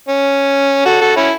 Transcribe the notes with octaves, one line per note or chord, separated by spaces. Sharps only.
C#4
F#4 A4
F#4 A4
C#4 E4